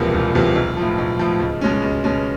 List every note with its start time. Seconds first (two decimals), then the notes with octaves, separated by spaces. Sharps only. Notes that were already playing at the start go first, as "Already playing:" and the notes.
Already playing: E1 E2 C3 F3 A#3
0.14 E1
0.35 E2 C3 F3 A#3
0.55 B1
0.77 A2 F3
0.98 B1
1.19 A2 F3
1.40 C#2
1.61 B2 G#3 C#4
1.82 C#2
2.04 B2 G#3 C#4